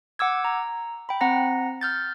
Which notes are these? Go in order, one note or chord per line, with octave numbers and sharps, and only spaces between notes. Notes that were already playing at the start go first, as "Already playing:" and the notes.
F#5 D6 E6 G#6
A#5
G5 B5
C4 F#5 A#5 A#6
F6 G6 A6